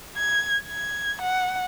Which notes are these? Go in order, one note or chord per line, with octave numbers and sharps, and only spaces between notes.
G#6
G#6
F#5